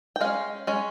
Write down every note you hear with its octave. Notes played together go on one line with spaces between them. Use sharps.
G5
G#3 C#4 F5
G#3 C#4